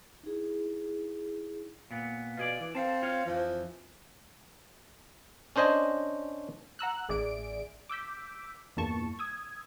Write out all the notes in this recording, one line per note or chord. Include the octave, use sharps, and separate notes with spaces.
D#4 E4 G#4
A#2 B3
B2 F4 G#4 D5
E3
C4 A4 F5 A5
F4 C#5 F5
F2 E3 F3
C#4 D4 C5 D#5 G#5
F#5 A#5 E6 F#6
A1 G#4 D5 E5 D7
D6 E6 G6 B6
E2 G2 A#2 A5 C#6
D#6 E6 G#6